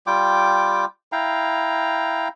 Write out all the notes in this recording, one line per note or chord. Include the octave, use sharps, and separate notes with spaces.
G3 F4 G5 D6
E4 F5 G5 A#5